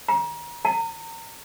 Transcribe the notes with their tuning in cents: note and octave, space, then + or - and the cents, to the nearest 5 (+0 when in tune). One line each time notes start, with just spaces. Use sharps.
A#5 +30
A#5 -35